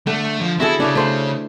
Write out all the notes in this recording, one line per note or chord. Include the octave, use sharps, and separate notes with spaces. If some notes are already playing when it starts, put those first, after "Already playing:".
D3 A3
F3
E4 F#4 G#4 A4
C#3 D4 E4 C#5
A3 C5 F#5